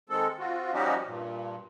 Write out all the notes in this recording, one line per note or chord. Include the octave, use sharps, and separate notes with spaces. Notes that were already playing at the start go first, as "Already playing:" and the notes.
D#3 G#3 C4 A4
C4 F4 F#4
F3 G3 C#4 D#4 F#4 G4
G2 A#2